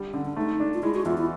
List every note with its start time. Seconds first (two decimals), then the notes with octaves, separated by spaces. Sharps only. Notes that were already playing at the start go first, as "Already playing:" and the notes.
Already playing: D3 G3
0.14 D3 C#4
0.25 D4
0.36 A3 D#4
0.60 D4
0.74 F4
0.83 G#3 E4
0.94 F#4
1.05 E2 F4
1.18 E4